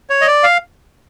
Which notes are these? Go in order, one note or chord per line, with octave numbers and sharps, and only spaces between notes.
C#5
D#5
D5
F5